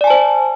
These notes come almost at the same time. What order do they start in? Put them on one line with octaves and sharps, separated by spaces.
D5 G#5 A5 C5